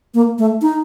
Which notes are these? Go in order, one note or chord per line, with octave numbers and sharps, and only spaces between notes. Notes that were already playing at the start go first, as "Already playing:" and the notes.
A#3
A3
D#4